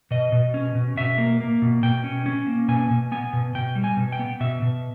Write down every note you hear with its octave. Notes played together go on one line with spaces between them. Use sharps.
B2 D#5
B2
C#4
B2
B2 E5
A#3
A#3
B2
B2 G5
C#4
C#4
A#3
B2 G#5
B2
B3 G#5
B2
B2 G5
G3
G#5
B2
G5
B3
B2 E5
B2